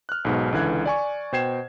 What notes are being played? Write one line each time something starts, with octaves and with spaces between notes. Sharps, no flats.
F6 F#6
B1 G#2 B2
C#2 D3 E3 F#6 G#6
D5 G#5 C#6
B2 C5 G5 G#6 C7 E7